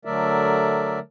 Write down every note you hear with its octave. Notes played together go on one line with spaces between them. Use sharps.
D3 F#3 A3 A#4 D5 E5